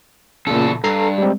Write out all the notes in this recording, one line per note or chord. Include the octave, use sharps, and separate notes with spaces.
E2 A#2 C#3 A4
G2 A4 A#5 C7
G3 G#3 C4